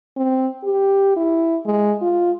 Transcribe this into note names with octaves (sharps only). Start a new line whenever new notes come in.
C4
G4
E4
G#3
F4